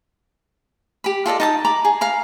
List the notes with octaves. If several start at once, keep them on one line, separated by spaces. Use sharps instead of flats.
G4 B5
F4 A4 D5 D#5
D#4 A5 D#6
A#5 B5 D6
G#4
F5 A#5 B5